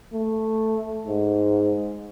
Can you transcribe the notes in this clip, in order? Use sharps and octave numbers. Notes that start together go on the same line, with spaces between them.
A3
G#2